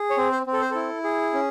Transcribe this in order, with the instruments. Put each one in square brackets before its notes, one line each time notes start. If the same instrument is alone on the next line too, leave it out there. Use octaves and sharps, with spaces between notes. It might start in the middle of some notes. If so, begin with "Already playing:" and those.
Already playing: [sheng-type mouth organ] G#4
C#5
C4
C5
C4
A4
C5
E4 A4
G#4
C#4